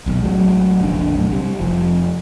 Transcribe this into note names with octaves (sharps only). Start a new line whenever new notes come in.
D#1 B1
A1 F#3 G#3
F1 A#1 D3 D4
B1 F#2 A2
C3 G3
F1 F3